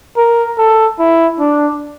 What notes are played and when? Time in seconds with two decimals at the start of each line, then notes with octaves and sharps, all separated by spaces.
0.17 A#4
0.58 A4
0.99 E4
1.39 D4